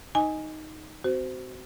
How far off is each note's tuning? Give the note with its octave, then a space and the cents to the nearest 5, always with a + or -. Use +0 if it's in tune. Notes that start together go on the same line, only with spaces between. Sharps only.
D#4 +0 D#5 +0 G#5 -5
C4 -25 F#4 +25 C5 -20